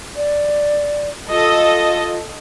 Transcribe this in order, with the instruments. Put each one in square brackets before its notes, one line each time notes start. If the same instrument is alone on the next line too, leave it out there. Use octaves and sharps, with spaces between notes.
[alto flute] D5
[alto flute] F4 [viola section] A4 D#5